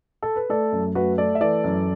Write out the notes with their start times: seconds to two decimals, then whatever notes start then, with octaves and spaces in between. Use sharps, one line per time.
0.23 A4
0.36 B4
0.49 A3 A4 D5
0.72 F#2
0.95 A3 F#4 B4
1.18 A3 A4 D5
1.35 E5
1.41 E3 A4 D5
1.64 F#2